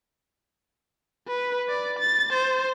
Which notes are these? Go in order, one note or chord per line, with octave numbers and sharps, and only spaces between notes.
B4
D5
A6
C5